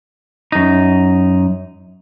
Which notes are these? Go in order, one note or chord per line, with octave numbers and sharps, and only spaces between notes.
F#2 D#4